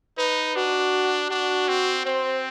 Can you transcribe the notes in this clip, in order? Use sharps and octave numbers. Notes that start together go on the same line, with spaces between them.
D#4 B4
D4 F#4
D4 F#4
C4
C4 C5